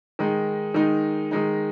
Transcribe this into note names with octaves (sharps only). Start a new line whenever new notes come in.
D#3 G#3 D#4
D#3 G#3 D#4
D#3 G#3 D#4